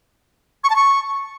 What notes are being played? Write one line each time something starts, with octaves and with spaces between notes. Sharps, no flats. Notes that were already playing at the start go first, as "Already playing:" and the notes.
C#6
A5
C#6